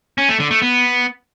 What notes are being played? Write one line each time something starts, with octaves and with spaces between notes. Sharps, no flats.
C#4
A3
D3
A3
B3